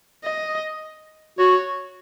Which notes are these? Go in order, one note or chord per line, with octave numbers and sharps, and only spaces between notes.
D#5
F#4 C#5